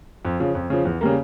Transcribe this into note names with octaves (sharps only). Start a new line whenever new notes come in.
F2
C#3 F3
F2
C#3 F3
E2
C#3 G3 A#3